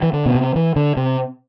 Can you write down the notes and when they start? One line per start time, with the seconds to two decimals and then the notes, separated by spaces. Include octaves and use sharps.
0.02 E3
0.13 D3
0.26 B2
0.35 C3
0.56 E3
0.76 D3
0.97 C3